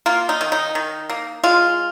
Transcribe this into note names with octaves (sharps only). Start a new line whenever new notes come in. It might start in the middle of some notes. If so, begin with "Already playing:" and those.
A#3 F4
D#4
D#3
D#4
D#3
A#3
G#3 F4